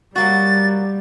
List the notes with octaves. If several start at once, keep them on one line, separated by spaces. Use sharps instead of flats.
F#3 G3 A#3 F#4 A6